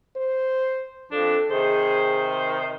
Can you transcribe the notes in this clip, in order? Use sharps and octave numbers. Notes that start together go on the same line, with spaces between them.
C5
F2 F3 D4 A4
C3 D#3 G#4 C5